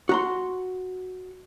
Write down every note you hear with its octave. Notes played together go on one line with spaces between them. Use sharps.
F#4 A#5 C6